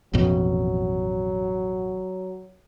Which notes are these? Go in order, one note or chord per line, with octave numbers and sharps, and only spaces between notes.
A1 F2 B2 F#3